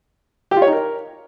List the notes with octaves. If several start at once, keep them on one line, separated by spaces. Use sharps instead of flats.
G4
F4
C#5
D#4
A#4